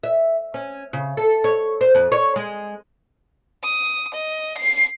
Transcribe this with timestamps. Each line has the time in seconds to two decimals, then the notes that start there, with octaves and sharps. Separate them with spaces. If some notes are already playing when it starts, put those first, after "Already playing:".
0.04 E5
0.54 C#4
0.93 C#3
1.17 A4
1.44 C#5
1.81 C5
1.95 F2
2.12 C#5
2.36 G#3
3.63 D#6
4.14 D#5
4.57 C7